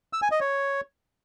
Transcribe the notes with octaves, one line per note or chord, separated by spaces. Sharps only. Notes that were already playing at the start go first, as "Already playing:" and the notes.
E6
G#5
D#5
C#5